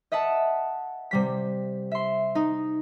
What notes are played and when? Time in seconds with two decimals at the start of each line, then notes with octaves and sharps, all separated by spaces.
0.12 D#5 E5 F#5 A5
1.11 C3 G3 B6
1.91 E5 C6
2.35 D#4